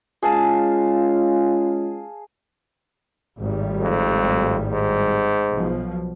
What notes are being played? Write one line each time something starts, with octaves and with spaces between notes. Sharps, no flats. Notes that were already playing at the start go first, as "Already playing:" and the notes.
G#3 C#4 F4 G#4 F5 A5
G#1 A2 G3
F2
G#2
B1 B2 F3